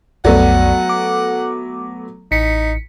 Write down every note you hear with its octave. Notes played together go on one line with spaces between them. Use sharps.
B1 F2 F#3 A3 B3 D5 F#5
D6
A1 D#4 B6 C#7